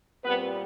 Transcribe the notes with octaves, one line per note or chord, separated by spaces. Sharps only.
A#2 G3 B3 C4 B4